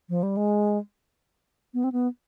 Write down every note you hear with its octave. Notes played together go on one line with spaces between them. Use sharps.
F3
G3
G#3
B3
C4
B3